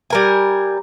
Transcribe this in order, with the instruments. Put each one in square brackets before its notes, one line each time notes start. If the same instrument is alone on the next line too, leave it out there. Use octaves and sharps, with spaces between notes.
[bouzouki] G3 A#4 G#5